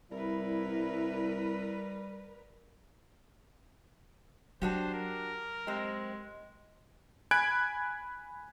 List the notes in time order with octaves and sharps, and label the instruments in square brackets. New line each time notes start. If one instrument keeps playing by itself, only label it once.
[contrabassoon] C2 [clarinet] G3 [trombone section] E4 [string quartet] A#4 B4
[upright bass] F#3 [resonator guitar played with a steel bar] D4 F#4 G4 [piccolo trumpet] C5
[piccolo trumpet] A#4
[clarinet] G#3 [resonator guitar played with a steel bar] C4 G4
[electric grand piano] G#5 B5 F#6 G#6 D7